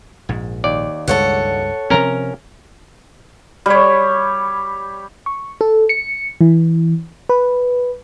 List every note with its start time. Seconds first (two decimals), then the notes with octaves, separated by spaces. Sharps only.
0.29 A#1 G#2
0.64 D#2 D5
1.08 C#2 G2 G#3 A4 C#5 F#5
1.90 C3 F3 C4 C#4 A#4 A#5
3.66 G3 C#5
5.26 C#6
5.61 A4
5.89 C#7
6.41 E3
7.29 B4